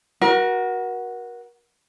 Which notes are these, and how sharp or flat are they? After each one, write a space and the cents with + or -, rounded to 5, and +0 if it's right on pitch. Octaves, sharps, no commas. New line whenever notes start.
F#4 +0 A#4 +35